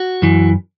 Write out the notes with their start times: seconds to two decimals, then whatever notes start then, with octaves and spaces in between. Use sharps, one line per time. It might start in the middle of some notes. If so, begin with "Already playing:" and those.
Already playing: F#4
0.22 F#2 E3